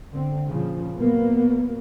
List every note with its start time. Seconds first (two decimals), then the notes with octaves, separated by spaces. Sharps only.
0.11 D3 C4
0.45 A#2 C#3 F3
0.95 A#2 F#3 A#3 B3